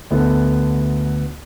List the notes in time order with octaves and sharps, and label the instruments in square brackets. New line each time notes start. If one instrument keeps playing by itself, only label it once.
[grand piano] D2 B3 A4